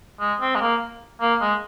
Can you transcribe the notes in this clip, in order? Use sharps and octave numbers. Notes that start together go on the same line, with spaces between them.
G#3
C4
G#3
A#3
A#3
G#3